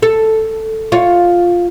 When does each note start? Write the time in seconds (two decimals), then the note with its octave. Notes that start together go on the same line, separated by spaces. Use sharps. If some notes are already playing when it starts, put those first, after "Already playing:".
0.02 A4
0.92 F4 C#5